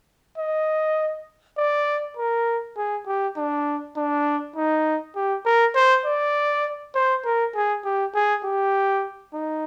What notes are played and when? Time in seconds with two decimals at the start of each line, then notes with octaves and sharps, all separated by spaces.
0.38 D#5
1.57 D5
2.17 A#4
2.77 G#4
3.07 G4
3.37 D4
3.96 D4
4.56 D#4
5.16 G4
5.45 A#4
5.75 C5
6.06 D5
6.95 C5
7.25 A#4
7.55 G#4
7.85 G4
8.14 G#4
8.44 G4
9.34 D#4